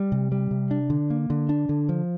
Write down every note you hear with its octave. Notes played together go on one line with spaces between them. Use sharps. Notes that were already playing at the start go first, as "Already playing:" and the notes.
Already playing: G3
C3
G3
C3
D4
D3
A#3
D3
D4
D3
F3